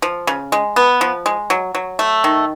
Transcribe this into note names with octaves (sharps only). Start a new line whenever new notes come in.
F3
C#3
G#3
B3
F3
G#3
F#3
F#3
A3
D#3